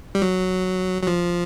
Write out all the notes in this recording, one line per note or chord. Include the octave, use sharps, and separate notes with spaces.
G3
F#3
F#3
F3